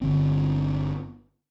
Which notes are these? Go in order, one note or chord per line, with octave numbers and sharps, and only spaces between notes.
G1 D3 C4